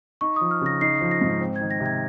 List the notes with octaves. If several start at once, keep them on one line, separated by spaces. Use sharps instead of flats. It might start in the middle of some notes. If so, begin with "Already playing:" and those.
D#4 C#6
F3 D#6
F6
C#3 A#6
D#4 C7
F3
A#6
G#2
C4
G#6
D#3
A#6
C3
G#6